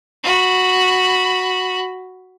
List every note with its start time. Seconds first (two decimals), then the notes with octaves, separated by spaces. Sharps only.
0.23 F#4 B5